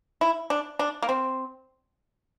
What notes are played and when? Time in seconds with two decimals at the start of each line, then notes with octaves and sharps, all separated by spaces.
0.21 E4
0.50 D4
0.79 D4
1.02 A#3
1.09 C4